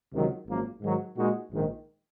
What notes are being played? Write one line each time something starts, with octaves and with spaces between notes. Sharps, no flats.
C#2 C3 D#3 F#3
G#1 F#2 F3 A#3
G#2 D#3 F#3
A#2 G#3 D#4 F#4
A#1 G#2 D#3